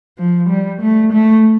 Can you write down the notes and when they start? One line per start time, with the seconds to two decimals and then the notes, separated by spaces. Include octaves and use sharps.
0.18 F3
0.50 G3
0.81 A3
1.13 A3